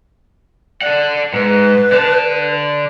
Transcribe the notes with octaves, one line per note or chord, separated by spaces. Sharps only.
A4 D5 F#5
G#2 B4
D3 A5